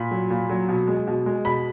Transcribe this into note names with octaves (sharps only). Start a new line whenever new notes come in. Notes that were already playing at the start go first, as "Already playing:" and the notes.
Already playing: A#2 B5
F#3
A#2
F#3
B2
G#3
B2
G#3
B2 B5